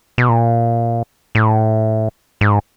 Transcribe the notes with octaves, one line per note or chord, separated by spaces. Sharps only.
B2
A#2
A2
G#2